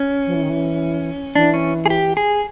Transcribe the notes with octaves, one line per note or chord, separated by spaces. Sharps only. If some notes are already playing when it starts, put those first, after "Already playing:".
Already playing: C#4
F3
E3
D#3
E3
E3 D4
C#4
G#4
G4
G#4